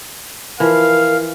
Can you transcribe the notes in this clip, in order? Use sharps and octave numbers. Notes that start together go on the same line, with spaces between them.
E3 F3 A#4 F5